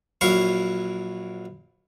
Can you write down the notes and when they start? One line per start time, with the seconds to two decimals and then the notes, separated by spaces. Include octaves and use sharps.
0.21 A#1 F#3 E4 F5 C#6